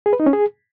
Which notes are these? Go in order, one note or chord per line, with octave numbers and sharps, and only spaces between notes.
G#4
B4
D#4
C#4
G#4